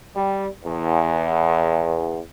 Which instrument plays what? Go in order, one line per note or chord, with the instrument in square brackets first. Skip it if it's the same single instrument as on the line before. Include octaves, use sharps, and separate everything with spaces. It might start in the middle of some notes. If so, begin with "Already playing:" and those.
[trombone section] G3
E2